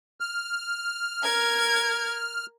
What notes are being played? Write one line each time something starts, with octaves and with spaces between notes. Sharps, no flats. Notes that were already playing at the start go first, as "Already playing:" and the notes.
F6
A#4 G#6